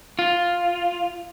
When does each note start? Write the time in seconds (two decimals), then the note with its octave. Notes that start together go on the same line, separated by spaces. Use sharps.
0.19 F4